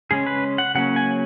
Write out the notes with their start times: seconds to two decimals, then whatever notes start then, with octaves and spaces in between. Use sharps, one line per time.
0.11 C#3 G#3 C#4 G#4
0.26 B4
0.58 F#5
0.75 C#3 F#3 A#3 C#4 F#5
0.96 G#5